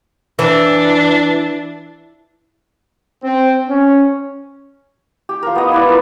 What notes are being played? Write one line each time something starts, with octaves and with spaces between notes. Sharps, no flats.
E3 D4
C4
C#4
G4
F3 A#4
B3 D#5
E4 B4 D5
F4 A#4 B4